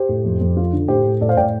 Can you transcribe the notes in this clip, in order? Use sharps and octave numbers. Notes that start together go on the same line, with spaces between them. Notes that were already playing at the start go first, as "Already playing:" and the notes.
Already playing: G4 C5
A2
F2
F2
F4
D3
A2 G4 C5
A2
A2 A4 D5
C5 F5
A2 D5 G5